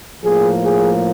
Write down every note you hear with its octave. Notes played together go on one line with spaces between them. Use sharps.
A2 F3 A#3 G#4
G#4